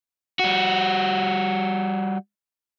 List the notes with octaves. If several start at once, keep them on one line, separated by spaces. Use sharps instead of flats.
G3 F#4